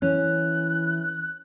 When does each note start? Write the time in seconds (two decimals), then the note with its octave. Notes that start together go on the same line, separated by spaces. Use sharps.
0.02 E3 C#4 F#6